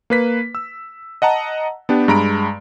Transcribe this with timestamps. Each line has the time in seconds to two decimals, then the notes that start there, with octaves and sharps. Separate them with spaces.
0.10 A#3 B4 B6
0.55 E6
1.22 D#5 F#5 A5 A#5
1.89 B3 D4 G4
2.08 G2 G#3 A#5 B5 D7